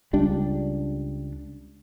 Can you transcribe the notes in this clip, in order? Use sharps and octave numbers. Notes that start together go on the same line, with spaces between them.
C#2 G3 D4